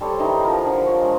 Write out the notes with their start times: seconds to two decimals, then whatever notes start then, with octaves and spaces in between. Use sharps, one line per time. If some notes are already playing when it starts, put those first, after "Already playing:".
0.01 G3 A4 C5 C#5
0.20 D#3 E3 D#4
0.45 F3 A#4
0.66 D3
0.86 F4 C5 C#5
1.01 G#3